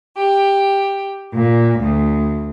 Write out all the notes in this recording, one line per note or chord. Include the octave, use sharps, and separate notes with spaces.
G4
A#2
D2